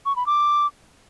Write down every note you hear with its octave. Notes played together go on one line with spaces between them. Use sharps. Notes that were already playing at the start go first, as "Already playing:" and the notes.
C#6
B5
D6